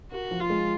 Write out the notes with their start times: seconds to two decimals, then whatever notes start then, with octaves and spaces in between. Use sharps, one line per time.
0.12 F#4 A#4
0.31 F3
0.41 F4
0.50 G#3